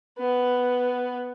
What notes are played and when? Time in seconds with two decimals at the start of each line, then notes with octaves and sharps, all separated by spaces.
0.18 B3 B4